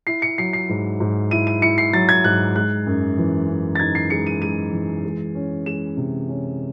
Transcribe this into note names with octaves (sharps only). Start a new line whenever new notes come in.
E4 C7
C#7
F#3 C7
C7
G#2
G#2
E4 D#7
D#7
E4 C#7
C7
F#3 A6
G#6
G#2 F#6
G#3 F#6
F#2
E3
F#2
A6
D#4 G#6
C7
G#3 C#7
D#7
G#3 D#7
E3
G#3
C#4
G#3 E7
C3
C#4